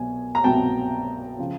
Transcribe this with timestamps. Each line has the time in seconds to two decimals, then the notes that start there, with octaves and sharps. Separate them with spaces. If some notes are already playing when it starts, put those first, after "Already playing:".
Already playing: C2 B2 F#3 B3 G#5
0.35 A#5
0.44 C2 B2 F#3 B3 G5 A5
1.39 C#3 F3